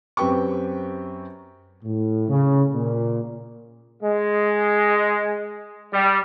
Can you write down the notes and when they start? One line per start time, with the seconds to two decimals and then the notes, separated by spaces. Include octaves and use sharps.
0.17 F#2 C4 G4 B4 G5 C#6
1.84 A2
2.29 C#3
2.74 A#2
4.02 G#3
5.93 G3